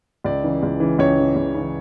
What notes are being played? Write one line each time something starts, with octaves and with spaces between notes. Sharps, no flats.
C#2 D5
C#3 E3
C#2
C#3 E3
C#2 C#5
C#3 E3
C#2
C#3 E3